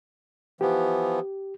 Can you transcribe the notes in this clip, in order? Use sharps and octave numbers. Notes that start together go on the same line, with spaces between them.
E3 F3 B3 G4